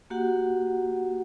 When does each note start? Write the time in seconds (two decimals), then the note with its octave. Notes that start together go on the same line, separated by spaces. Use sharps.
0.10 A#3 F#4 G4 F#5